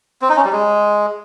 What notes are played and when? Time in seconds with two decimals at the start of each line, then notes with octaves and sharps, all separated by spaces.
0.22 C4
0.29 D#4
0.37 C#4
0.45 G3
0.52 G#3